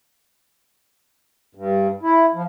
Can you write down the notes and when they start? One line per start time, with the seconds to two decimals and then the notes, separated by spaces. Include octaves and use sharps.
1.55 G2
2.03 E4
2.34 F3